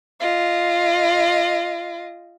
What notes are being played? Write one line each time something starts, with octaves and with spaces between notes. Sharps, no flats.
F4 D#5